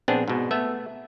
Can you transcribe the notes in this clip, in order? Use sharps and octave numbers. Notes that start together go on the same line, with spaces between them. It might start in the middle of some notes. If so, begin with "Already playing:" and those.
A#1 B3 C4 D4 G#4
G#2 B2
A3 B3 E5